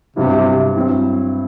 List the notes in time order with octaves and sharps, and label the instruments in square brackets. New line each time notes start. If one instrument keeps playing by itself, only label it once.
[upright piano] G2 F#3 B3 E4 [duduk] C3
[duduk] C3
[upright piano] G2 F#3 C4 E4